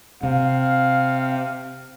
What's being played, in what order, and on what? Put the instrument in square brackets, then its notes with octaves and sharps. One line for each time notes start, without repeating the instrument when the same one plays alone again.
[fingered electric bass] C3 [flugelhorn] F5